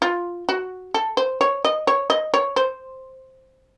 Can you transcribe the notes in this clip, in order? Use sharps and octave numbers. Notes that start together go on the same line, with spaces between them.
F4
F#4
A4
C5
C#5
D#5
C#5
D#5
C#5
C5